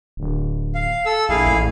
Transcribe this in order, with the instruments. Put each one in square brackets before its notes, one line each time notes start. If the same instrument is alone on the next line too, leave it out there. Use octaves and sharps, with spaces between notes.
[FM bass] D1
[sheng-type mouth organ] F5
A4 E6
[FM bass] A#1 [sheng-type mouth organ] E4 G#4 F5
[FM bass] A1